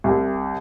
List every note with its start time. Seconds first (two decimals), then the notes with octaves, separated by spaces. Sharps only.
0.04 C2